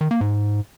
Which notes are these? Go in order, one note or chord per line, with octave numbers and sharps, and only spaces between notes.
D#3
A#3
G#2